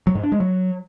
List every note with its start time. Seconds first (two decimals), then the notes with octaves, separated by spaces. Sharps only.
0.07 F#3
0.15 G#2
0.23 D4
0.32 G#3
0.40 F#3